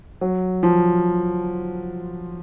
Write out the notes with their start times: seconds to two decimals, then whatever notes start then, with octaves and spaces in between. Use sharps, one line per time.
0.21 F#3
0.63 F3